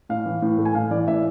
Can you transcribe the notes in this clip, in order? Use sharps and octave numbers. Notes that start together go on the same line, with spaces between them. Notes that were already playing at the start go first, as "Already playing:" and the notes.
A2 F5
E3
A2
A3
G#5
A2 F5
E3 D5
A2 E5